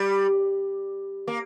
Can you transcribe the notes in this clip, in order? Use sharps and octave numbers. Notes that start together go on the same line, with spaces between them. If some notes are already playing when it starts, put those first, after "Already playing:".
Already playing: G3
A#3